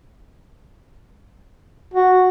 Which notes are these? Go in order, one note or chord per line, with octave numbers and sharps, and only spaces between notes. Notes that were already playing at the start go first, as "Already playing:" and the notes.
F#4